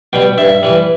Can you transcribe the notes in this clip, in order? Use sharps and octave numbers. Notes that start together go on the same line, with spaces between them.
B2 G3 G5
G2 E5
E3 G3